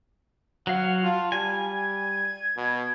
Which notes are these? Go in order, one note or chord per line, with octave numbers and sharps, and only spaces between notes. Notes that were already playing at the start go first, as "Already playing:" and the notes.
F#3 F5 F#5
F4 A5
G3 G#5
G#6
B2